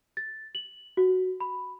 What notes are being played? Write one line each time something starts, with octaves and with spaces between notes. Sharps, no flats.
A6
F#7
F#4
B5